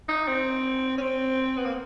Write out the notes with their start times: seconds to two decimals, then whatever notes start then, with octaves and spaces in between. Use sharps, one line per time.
0.09 D#4
0.27 C4
0.98 C#4
1.01 C4
1.57 B3
1.65 A#3